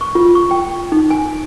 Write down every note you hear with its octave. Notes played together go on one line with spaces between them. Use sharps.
C#6
F4
C#6
G5
D#4
G#5